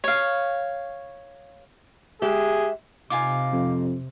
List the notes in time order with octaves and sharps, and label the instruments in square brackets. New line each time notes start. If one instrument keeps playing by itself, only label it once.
[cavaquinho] C#5 F5
[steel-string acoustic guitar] G#3 E5 [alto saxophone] G4 [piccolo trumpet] G#4
[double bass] C3 [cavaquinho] D#4 F4 G#5 [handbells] F5 D6
[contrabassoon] F2